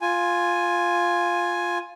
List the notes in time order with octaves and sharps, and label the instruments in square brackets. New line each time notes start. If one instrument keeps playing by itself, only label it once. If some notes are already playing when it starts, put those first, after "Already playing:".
[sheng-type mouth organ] F4 G#5